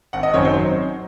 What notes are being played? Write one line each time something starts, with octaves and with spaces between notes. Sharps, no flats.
G#1 F#5
D#5
F#2 D#3 F#3 C4 C#5
C5